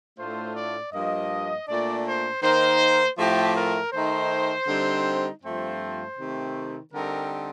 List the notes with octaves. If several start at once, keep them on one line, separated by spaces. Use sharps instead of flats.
A2 A3 D4 F4 C5
D5
G2 F3 A#3 D#5
A#2 A3 D4 D5
C5
D#3 A#3 D#4 C5
A2 F3 A3 C4 G4
A#4
D#3 A3 D#4 C5
D3 G3 C4 D#4
G2 F3 A3 C4 F4 C5
C3 D#3 A3
D3 G3 C4 D#4 A#4